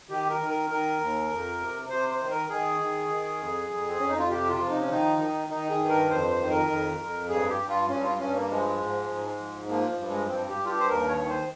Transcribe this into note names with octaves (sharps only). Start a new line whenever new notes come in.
D#3 G4
A#4
D#3
A#4
D#3 A#4
D#2
F2
C3
C3 C5
C5
D#3
A#4
D#3 G#4
D#3
D#3
F2
F2
C4
F2 C#4
D#4
F4
C3 G4
F4
F3
D#4
C#4
D#3 D#4
D#3
D#3 D#4
G#4
G2
A#4
F2 C5
C5
D#3
A#4
F2
F2
G2 G#4
G4
G2
F4
G2 C#4
F4
G2 C#4
A#3
F3 G#3
G#2
G#2
F3
F3 A#3
G2
G#3
G2 C4
G4
G2
F4
G4
C5
D#2 A#4
C#5
D#3
C5